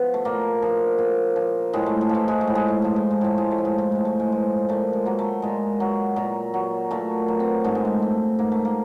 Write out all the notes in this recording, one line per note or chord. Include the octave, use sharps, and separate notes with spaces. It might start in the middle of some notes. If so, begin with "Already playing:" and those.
Already playing: F3 B3
A3
A#2 A#3
F3
A#2
F3
A2 G#3
A3
G#3
F3
A3
G#3
A3
A2
G#3
A3
F3 G#3
A3
G#3
A2 A3
G#3
A3
F3
G#3
A3
A2 G#3
A3
G#3
F3
A#2 A3
G#3
F#3 A#3
A3
A#2 G#3
F#3
A#2
F#3
A#2 A3
F#3
C4
G#2 A3
G#3
A3
F3 A3
G#2 A#3
A3
A#3